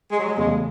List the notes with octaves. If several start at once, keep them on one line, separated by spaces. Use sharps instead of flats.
G#3
F#3
G#3
E2 C#3 F#3 G#3 A3